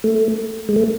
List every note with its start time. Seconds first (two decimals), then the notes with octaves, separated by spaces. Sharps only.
0.04 A3
0.69 G#3
0.76 A3